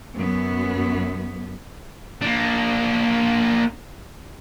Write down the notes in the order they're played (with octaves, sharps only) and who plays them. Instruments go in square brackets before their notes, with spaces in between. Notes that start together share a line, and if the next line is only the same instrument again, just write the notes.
[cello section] F#2 B3
[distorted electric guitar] A#3 D4